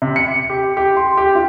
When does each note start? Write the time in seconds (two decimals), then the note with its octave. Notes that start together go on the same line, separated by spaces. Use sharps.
0.02 C3
0.16 C#7
0.50 G4
0.77 G4
0.96 C6
1.17 G4
1.35 F4